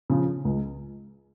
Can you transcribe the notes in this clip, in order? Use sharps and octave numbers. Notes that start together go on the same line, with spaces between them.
C#3 F3
C#2